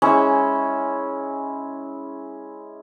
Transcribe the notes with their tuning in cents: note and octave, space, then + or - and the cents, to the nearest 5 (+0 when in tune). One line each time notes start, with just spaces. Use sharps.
G#3 +0 C#4 +0 E4 -15